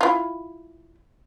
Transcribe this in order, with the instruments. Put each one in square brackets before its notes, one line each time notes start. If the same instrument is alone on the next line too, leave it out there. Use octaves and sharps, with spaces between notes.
[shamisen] E4 F4